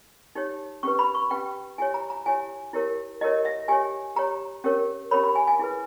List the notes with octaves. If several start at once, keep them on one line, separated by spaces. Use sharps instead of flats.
D#4 G4 C#5
C#4 G4 B4 C#6
B5
C#6
C#4 G4 B4 G5
E4 G4 C#5 G#5
A#5
A#5
E4 G4 C#5 G#5
E4 G4 A#4 C#5
E4 G4 A#4 C#5 D#5
E5
G4 C#5 G#5
G4 C#5 A#5
C#4 G4 A#4 C#5
C#4 G4 A#4 C#5 B5
B5
G#5
G#5
E4 G#4 B4